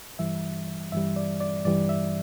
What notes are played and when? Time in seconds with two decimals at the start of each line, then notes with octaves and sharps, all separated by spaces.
0.19 G2 E3 G3 E5
0.92 G2 E3 G3 E5
1.16 D5
1.40 D5
1.65 G2 E3 G3 D5
1.89 E5